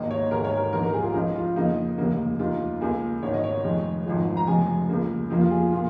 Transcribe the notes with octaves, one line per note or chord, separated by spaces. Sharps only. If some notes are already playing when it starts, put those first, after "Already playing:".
Already playing: G#1 G#2 D#3 A#3 D#5
C#5
G#1 G#2 G#3 A#4
C#5
A#4
A#1 G#2 D#3 A#4
A#4
G#4
F4
G#4
C#2 C#3 F3 D#4
F4
F2 C#3 A#3 D#4
F1 D#2 C#3 A#3
D#2 D#3 A#3 F4
C#2 C#3 A#3 G#4
G#1 G#2 D#3 C#5
D#5
C#5
F1 F2 D#3 G#3
G#1 G#2 F3 G#3
A#5
F1 F2 C#3 G#3 G#5
C#2 C#3 A#3
F2 F3 A#3
F4
G#4
A#2 F4